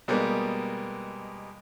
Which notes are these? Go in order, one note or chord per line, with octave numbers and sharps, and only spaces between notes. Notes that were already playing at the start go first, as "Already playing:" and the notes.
B2 G3 G#3 A#3 B3